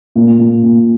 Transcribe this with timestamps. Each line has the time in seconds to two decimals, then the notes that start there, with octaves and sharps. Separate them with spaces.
0.15 A#2
0.39 A#2
0.63 A#2